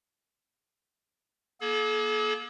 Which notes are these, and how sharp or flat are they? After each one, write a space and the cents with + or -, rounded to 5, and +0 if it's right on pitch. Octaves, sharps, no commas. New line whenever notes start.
A#3 +35 A4 -45